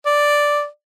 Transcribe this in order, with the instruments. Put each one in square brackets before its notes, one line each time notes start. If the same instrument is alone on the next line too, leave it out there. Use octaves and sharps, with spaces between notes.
[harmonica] D5